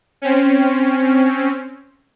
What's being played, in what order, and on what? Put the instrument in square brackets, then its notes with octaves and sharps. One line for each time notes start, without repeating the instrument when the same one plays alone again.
[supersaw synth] C4 C#4